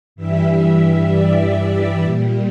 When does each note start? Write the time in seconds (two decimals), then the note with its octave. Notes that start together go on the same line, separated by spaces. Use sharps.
0.16 G2 E3 G3 E5
1.10 D5
2.02 A#2
2.07 G3